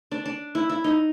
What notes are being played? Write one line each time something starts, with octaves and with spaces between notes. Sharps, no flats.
D4
D4
E4
E4
D#4